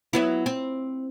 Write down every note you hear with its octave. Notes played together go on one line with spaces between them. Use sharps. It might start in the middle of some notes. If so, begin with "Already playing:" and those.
F#3 B3 E4
C4